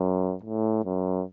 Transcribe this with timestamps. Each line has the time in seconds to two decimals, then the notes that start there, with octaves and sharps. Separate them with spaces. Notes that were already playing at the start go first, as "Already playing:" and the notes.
Already playing: F#2
0.43 A2
0.85 F#2